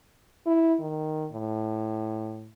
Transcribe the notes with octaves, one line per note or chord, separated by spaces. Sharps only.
E4
D#3
A2